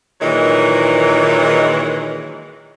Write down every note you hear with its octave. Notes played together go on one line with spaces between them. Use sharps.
A#2 D#3 E3 F#3 G#3